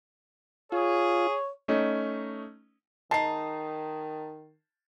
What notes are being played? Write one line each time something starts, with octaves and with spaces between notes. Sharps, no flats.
F4 G#4 C#5
A3 C#4 D#4
D#3 G#3 D#4 A5 C7